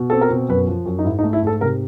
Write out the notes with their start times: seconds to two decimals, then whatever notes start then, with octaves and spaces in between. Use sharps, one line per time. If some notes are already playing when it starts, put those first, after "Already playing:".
Already playing: B2
0.10 C4 A4
0.21 A#4
0.30 B2
0.49 F#2 B4
0.67 F3
0.86 F#2
0.99 D#4
1.05 G#2 E4
1.19 D#4
1.23 A3
1.33 E4
1.42 G#2 A4
1.61 C3 A#4